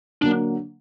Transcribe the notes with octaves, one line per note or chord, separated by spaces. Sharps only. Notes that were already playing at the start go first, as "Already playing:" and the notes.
D3 F#3 A#3 D4